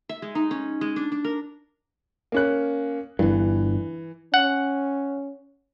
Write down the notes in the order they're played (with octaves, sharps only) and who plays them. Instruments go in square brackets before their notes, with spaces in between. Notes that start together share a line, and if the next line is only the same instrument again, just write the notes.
[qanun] E5
G#3
D#4
C#4
G#3
D4
D4
A#4
[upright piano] A#3 C#4 F#6
[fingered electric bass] G1 G2 [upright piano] E3
[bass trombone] C#4 [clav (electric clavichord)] F#5